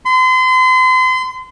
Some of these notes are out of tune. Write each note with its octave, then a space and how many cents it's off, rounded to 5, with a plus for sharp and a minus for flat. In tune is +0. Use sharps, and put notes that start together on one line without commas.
C6 -35